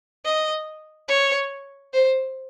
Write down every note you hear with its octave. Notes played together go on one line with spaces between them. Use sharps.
D#5
C#5
C5